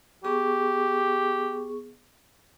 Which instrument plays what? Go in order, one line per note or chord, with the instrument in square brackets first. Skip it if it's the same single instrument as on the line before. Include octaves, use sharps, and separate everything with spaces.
[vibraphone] B3 G#4 C#6 [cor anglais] G4